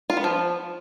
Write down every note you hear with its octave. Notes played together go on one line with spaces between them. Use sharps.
F4
B3
F3